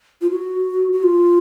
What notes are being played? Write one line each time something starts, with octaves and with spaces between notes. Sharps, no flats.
F4
F#4
F#4
F4